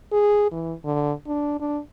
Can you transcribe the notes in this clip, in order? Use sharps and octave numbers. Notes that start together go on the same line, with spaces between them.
G#4
E3
D3
D4
D4